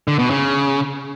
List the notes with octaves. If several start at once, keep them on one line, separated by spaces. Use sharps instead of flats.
D3
B2
C#3